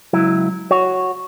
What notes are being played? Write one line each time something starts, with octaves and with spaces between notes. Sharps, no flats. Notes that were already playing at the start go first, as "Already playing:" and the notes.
C#2 F#3 E4
F#4 C#5